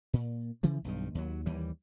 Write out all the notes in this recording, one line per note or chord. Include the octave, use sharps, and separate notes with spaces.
A#2
C#3 E3 F3
B1 G2 D#3
D#2 F#3
D#2 E3 G3